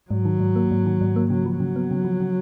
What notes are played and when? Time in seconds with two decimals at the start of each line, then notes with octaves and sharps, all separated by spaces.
0.10 G#2 F#3
0.25 D#3
0.40 G#2
0.56 A#3
0.71 G#2
0.86 D#3
1.01 G#2
1.16 A#3
1.30 C#3 F#3
1.46 F3
1.60 C#3 F#3
1.76 B3
1.91 C#3
2.05 F3
2.20 C#3